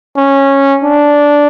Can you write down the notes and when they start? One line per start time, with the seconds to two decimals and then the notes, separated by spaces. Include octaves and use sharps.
0.17 C#4
0.84 D4